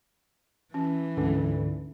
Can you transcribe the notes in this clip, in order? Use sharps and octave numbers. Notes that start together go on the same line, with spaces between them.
E3 C#4
D2 G#2 D3 C#4